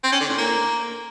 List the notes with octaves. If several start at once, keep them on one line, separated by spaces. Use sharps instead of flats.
C4
C#4
D3
A2
A#3